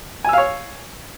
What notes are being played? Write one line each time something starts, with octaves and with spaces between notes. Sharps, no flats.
C#5 F5 G#5 E6